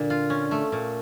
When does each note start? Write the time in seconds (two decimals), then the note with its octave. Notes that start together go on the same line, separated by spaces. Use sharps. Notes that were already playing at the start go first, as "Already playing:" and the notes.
Already playing: A#2 D3 D4
0.10 F4
0.30 C#4
0.51 A3
0.72 A#2